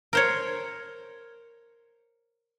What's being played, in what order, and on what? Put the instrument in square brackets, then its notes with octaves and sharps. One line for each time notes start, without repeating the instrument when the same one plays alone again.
[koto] A#4 C5 C#5